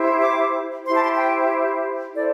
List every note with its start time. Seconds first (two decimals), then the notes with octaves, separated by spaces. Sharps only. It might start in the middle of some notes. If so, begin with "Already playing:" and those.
Already playing: E4 G4 C5
0.21 D6
0.85 E4 G4 C5 C6
0.94 A5
1.03 C6
1.17 G5
2.13 E4 A4 C5 D5